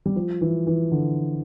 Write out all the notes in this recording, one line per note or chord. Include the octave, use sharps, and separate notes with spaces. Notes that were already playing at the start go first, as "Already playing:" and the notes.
G3
F3
E3
E3
D3